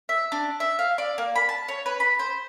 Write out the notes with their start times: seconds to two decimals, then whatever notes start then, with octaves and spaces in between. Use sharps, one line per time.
0.09 E5
0.32 D4
0.60 E5
0.79 F5
0.98 D5
1.18 A#3
1.36 B5
1.49 A5
1.68 C#5
1.86 B4
2.00 B5
2.19 C5